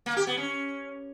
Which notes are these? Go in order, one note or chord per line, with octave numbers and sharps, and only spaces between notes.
A#3
G4
B3
C#4